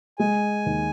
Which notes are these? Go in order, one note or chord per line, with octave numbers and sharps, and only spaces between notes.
G#3 G#5
D#2